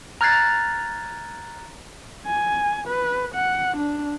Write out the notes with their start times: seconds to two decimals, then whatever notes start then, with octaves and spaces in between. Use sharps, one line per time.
0.21 A#5 F6 F#6 G#6 A6 C7
2.26 G#5
2.88 B4
3.35 F#5
3.77 D4